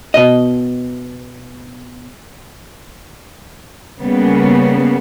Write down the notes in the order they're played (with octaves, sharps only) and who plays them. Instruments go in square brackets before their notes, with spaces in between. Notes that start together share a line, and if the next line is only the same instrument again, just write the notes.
[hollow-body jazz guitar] B2 D#5
[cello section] C#3 G3 A#3 B3